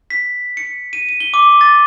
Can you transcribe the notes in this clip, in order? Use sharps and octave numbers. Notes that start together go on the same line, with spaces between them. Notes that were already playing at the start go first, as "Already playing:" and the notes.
B6
C#7
D#7
D#7
G7
D6
A6